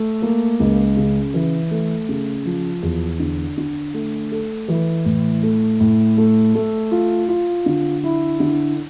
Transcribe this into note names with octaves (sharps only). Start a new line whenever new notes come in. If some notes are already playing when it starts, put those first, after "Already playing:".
Already playing: A3
A#3
C#2
C#3
E3
A3
C#3
F3
E2
D3
D3
A3
A4
E3
A2
A3
A2
A3
A3
F4
F4
D3
E4
D3